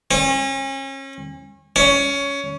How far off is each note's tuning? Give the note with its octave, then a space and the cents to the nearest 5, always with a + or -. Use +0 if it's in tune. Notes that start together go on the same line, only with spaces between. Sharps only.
C#4 -35
C#4 +15